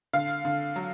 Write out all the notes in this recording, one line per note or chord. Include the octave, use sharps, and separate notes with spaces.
D3 F5
D3
F#3